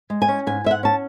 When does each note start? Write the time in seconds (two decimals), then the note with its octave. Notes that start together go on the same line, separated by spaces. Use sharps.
0.10 G#3
0.22 G#5
0.28 C#4
0.47 G#2 G#5
0.64 G#2 E5
0.71 F#5
0.83 C#4 A5